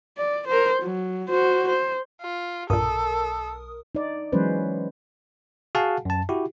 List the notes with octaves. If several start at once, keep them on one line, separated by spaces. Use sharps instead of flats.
D5
A#4 C5
F#3
F#4 C5
C5
F4
B1 G2 A#2 A4 A#4 D#6
D#4 D5
E3 F#3 G#3 C#4 B4 C5
F#4 G#4 F5 F#5 G#5 A5
F#2 A5
E4 F#4 G4